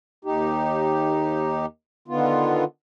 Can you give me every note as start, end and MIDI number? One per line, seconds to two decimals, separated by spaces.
0.25 1.66 39
0.25 1.66 63
0.25 1.66 67
2.08 2.64 50
2.08 2.64 51
2.08 2.64 59
2.08 2.64 65